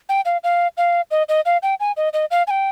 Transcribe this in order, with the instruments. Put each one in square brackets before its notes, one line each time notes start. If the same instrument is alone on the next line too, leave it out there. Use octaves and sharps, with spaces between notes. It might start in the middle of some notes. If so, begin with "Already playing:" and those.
[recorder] G5
F5
F5
F5
D#5
D#5
F5
G5
G#5
D#5
D#5
F5
G#5
G5